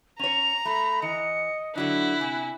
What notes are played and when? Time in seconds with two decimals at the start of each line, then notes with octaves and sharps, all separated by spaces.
0.19 C#4 C#5 A#5 F7
0.65 A3 B5
1.02 E3 D#5 C#7
1.76 D3 F#3 D4 E4 F#6
2.21 C3 G#5